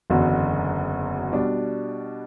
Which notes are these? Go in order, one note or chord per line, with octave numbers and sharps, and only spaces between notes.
F#1 E2 D3 F#3
B2 G3 D4